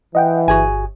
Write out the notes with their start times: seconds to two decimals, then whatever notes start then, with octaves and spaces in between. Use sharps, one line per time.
0.15 E3 D#5 F#5 G5
0.48 G1 F#4 G#4 G#5